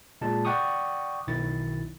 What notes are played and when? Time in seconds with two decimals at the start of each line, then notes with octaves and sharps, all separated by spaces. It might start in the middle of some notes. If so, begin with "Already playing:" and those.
0.21 A#2 G#3 A5
0.45 D5 F#5 G5 C#6 D#6
1.27 B1 D#3 E4 A6